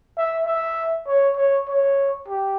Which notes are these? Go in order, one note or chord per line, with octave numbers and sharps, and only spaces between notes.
E5
E5
C#5
C#5
C#5
G4